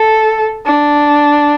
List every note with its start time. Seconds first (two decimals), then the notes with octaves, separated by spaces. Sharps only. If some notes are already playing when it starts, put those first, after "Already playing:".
Already playing: A4
0.66 D4